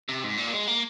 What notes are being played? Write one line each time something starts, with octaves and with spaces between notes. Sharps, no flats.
C3
G#2
A#2
A#3
G#3
A#3